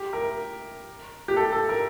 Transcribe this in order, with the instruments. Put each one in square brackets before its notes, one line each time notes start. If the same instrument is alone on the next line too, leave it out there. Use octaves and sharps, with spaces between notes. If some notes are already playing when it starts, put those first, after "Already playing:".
Already playing: [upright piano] G4
A#4
G4
A4
A4
A#4